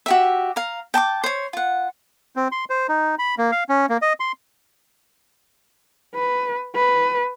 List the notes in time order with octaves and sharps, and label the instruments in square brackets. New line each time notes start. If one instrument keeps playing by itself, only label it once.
[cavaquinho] F#4 G4 E5
F5 A#5
G5 A5 A#5 D6
C5 C#5
F4 F#5
[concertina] C4
C6
C5
D#4
B5
A#3
F5
C#4
A#3
D#5
C6
[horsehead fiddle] B4
B4